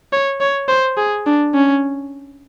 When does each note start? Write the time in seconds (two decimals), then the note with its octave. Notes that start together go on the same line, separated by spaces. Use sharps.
0.13 C#5
0.40 C#5
0.68 C5
0.97 G#4
1.26 D4
1.54 C#4